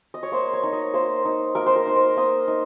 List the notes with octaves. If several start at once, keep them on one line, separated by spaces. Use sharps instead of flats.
D#5
C#5
A#3 C5
C#5
D#4
D#5
A#3 C5
D#4
A#3 A#4
C5
A#4
D#4
C5
A#3 D#5
D#4